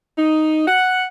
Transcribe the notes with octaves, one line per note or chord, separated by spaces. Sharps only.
D#4
F#5